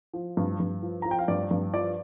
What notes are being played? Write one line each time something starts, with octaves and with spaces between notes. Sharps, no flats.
F3
G2
G2
F3
F3 A#5
G5
F5
G2 D5
G2
F3 D5